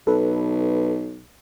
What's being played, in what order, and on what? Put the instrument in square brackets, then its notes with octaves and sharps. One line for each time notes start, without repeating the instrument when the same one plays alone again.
[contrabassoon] B1 [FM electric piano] A4 B4